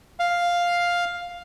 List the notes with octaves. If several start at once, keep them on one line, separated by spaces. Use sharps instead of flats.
F5